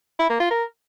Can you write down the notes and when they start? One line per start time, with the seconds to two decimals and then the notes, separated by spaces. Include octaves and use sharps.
0.19 E4
0.30 A#3
0.40 F4
0.51 A#4